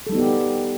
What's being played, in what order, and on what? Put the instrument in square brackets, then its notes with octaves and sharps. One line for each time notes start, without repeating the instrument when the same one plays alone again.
[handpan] A4
G3
D#4
B3
G4